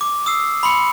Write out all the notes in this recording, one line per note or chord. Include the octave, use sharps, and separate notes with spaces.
D6
D#6 E6 C7
B5 C6 C#7